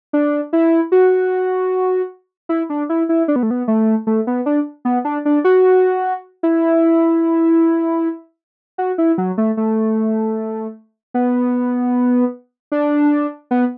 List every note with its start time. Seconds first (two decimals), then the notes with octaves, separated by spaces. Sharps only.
0.13 D4
0.53 E4
0.92 F#4
2.49 E4
2.70 D4
2.89 E4
3.09 E4
3.28 D4
3.36 B3
3.43 A3
3.51 B3
3.68 A3
4.07 A3
4.27 B3
4.46 D4
4.85 B3
5.05 D4
5.25 D4
5.44 F#4
6.43 E4
8.78 F#4
8.98 E4
9.18 F#3
9.38 A3
9.57 A3
11.14 B3
12.72 D4
13.51 B3